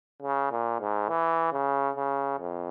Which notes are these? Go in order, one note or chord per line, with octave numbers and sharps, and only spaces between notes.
C#3
A#2
G#2
E3
C#3
C#3
F2